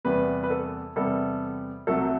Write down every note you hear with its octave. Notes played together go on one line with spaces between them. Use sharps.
E2 C3 G3 B3 B4
B4
A4
E2 C3 G3 B3 A4
C2 C3 F#3 A3 A4